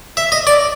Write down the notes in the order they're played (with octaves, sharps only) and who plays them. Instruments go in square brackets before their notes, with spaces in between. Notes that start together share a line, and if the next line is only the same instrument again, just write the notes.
[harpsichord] E5
D#5
D5